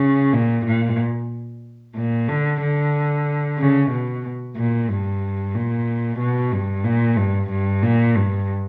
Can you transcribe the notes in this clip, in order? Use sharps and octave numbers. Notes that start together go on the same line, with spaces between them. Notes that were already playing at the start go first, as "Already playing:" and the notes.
Already playing: C#3
A#2
A#2
A#2
D3
D3
C#3
B2
A#2
G2
A#2
B2
G2
A#2
G2
G2
A#2
G2